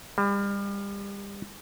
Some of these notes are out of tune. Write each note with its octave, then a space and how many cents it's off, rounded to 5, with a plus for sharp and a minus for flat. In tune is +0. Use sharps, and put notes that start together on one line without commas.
G3 +35